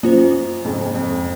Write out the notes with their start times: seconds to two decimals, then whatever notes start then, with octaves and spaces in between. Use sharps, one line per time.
0.03 F#2 A#3 F4 C5
0.65 F2 G#2
0.80 F2
0.95 F2